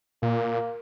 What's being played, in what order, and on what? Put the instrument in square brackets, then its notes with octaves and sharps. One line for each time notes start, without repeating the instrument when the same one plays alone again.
[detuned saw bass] A#2 [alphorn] A#3